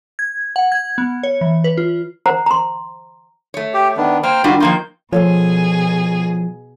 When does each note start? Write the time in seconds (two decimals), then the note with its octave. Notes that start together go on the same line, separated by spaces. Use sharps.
0.19 G#6
0.56 F#5
0.72 G#6
0.98 B3
1.23 C#5
1.41 E3
1.64 B4
1.77 F4
2.26 C5 F#5 A#5
2.46 A#5 C6
3.54 A3 C#5
3.74 G4
3.97 D#3 B3 D4
4.23 A#3 C5 G5 F6
4.44 D#3 G3 D4 F4 F#4
4.60 D#3 F3 A#3 F4 G6
5.13 B2 F3 F4 G#4 A4 C#5